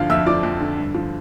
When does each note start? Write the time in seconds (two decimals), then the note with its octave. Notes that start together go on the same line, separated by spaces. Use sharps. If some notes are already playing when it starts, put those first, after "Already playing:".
Already playing: D2 D3 F3 F5 F6
0.10 F2 E5 E6
0.26 F3 D5 D6
0.43 F2
0.60 D3
0.78 G2
0.95 F3